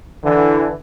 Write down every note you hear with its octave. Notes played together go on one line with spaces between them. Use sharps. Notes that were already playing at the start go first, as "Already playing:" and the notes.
D3 E3